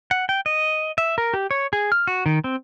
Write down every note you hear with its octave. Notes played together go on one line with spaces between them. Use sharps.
F#5
G5
D#5
E5
A#4
G4
C#5
G#4
F6
F#4
D#3
C4